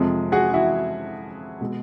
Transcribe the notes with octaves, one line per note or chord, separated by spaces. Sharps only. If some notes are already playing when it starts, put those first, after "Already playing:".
Already playing: F2 C3 F3 G#3
F#4 G#4
E4 F#4
B2 G#3